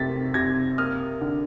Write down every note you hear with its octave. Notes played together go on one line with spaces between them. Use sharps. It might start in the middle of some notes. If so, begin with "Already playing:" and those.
Already playing: C3 A3 A6 B6
C3 G#6 A#6
A#3 D#6 F6
D3